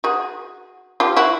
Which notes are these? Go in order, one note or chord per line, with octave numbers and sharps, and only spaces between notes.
F#4 G#4
F4 G4
E4 F#4